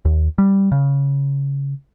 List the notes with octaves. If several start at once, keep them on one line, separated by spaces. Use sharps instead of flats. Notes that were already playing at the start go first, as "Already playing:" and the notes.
D#2
G3
C#3